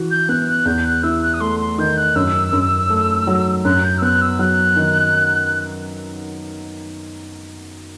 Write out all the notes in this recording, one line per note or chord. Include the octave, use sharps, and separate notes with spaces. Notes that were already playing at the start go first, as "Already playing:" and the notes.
Already playing: E3 F#4
G6
B3 F#6
F#6
E2 G6
F#6
E4 E6
F#6
D#6
A3 C6
C6
D#3 G6
F#6
F#2 E6
F#2
A3
F#3
F#2 F#6
G6
E6
B3 F#6
E6
F#3 F#6
D#3